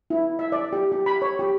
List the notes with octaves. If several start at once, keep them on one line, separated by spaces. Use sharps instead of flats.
E4
E5
D5
G4
G4
B5
C#5
G4